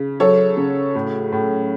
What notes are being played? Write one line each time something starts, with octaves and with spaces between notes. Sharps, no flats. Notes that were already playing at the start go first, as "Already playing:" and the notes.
Already playing: C#3
F#3 A4 C#5
C#3
A2
A2